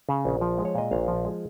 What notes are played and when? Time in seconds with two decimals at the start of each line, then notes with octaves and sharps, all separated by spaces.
0.09 C#3
0.25 A#1
0.41 F3
0.58 G#3
0.65 C#5
0.75 A#2 D#5
0.91 A#1 F5
1.08 F3
1.25 G#3